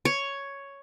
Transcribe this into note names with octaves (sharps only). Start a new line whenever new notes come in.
C#5